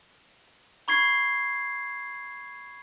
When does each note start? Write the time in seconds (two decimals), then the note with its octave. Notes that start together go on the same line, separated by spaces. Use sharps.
0.88 B5 C#6 G#6 C7